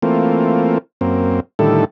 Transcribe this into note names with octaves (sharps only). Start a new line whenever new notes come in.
E3 A3 A#3 C4 F4
F#2 A#3 C4
A2 D3 D#3 G3 E4 A4